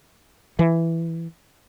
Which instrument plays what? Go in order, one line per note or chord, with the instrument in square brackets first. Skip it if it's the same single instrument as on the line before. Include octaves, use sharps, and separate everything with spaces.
[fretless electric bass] E3